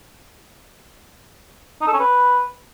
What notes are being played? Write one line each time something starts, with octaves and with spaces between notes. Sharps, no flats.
D#4
A4
C#4
B4